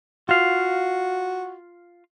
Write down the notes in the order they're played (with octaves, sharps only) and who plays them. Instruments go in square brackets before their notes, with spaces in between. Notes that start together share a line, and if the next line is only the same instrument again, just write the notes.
[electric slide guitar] F4 F5 [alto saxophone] F#4